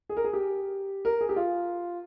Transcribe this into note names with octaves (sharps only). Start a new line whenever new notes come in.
G#4
A#4
G#4
G4
A#4
G#4
G4
F4